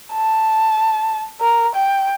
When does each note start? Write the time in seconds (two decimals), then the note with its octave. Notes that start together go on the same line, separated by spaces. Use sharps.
0.13 A5
1.41 A#4
1.76 G5